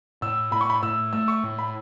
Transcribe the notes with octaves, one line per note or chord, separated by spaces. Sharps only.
A2 E6
A2 B5
C#6
B5
A2 E6
A3 E6
C#6
A2
B5